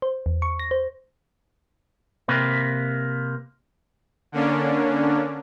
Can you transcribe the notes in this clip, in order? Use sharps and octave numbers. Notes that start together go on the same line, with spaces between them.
C5
E2
C#6
A#6
C5
C3 A#3 B4
D3 A#3 C#4 D4